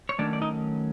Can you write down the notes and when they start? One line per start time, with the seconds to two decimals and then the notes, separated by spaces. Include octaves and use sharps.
0.09 C#5
0.19 D#3 F#3 A3 C#4 D4 D5
0.33 D5
0.42 D#4 D#5